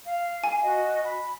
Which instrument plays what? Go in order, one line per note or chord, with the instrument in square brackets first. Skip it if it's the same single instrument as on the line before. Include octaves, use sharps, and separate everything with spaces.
[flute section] F5
[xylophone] G#5
[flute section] F#4 D#5
B5